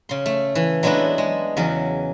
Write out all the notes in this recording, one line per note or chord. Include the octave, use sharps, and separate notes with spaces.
C#3 C6
A3
E3
F#3 G#3 A3 B3 D4 E4
G#3
E2 C#3 F#3